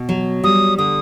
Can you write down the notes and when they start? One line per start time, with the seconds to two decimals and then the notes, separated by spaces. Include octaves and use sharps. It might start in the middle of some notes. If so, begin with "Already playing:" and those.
Already playing: B2
0.09 F#3
0.44 G3 D#6
0.78 D3 D#6